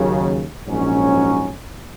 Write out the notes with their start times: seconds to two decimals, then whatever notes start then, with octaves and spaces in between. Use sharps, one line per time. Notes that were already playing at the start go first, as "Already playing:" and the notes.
Already playing: D#2 C#3 F#3
0.66 A#1 G#2 F#3 C#4